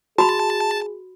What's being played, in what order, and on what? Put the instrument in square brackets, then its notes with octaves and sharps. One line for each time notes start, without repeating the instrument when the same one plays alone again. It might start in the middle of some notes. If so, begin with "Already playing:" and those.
[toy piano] F#4 B5 [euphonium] G#4 [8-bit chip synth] A5